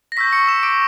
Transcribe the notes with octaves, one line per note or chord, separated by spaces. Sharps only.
A#6
C#6 E6 G6 B6
C#6 C#7
E6 E7
D6 D7